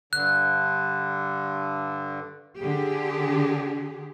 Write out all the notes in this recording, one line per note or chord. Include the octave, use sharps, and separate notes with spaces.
G2 D3 F#6
D3 G4 G#4